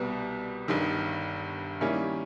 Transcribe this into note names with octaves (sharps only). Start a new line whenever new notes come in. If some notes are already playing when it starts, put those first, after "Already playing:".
Already playing: C2 B2 G3 B3
G1 G2 D#3
D#3 G3 A#3 C#4 E4